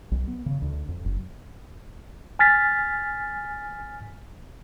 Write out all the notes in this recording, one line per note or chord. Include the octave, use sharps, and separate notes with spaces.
B1
B3
C#3
D2
F2
F#1
G#5 F6 A6 B6